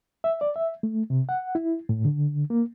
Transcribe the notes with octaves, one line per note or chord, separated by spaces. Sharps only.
E5
D5
E5
A3
C3
F#5
E4
A2
D3
A#3